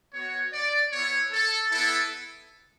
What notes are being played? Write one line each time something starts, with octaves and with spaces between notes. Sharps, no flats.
B3 F#4 C#5
D5
B3 E4 C#5
A4
B3 E4 A4